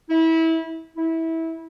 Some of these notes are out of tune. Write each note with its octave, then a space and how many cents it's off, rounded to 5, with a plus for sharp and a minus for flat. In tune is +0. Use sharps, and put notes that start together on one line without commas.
E4 -25
E4 -20